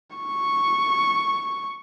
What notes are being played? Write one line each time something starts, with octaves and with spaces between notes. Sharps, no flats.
C#6